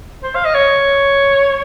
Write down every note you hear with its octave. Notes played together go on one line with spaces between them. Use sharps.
C5
F5
D#5
C#5